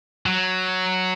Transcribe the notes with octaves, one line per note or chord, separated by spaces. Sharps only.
F#3